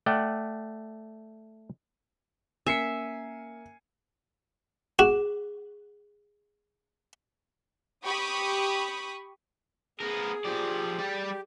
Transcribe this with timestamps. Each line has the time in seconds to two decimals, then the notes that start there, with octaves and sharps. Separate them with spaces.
0.06 A3 D5 F#5 G5
2.67 A#3 C#4 E5 G#5 C7 C#7
4.99 F#4 G#4
8.03 G4 B5 C#6 D#6
10.00 B3 G#4 A#4
10.45 F3 G4 D5
10.98 G3 D5